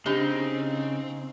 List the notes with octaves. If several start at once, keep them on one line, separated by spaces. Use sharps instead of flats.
C#3 C4 D4 D#4 G4